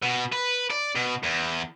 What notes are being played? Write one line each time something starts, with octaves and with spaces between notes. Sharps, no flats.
B2
B4
D5
B2
E2